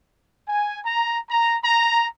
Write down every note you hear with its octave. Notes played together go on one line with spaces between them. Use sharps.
G#5
A#5
A#5
A#5